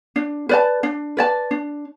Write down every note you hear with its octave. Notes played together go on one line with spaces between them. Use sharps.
D4
B4 D5 A5
D4
B4 D5 A5
D4